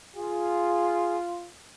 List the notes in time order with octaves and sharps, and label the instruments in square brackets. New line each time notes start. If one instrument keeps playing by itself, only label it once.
[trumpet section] F4 [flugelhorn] G#4